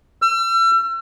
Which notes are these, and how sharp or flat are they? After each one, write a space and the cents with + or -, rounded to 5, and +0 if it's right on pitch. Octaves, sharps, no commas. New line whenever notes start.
E6 +40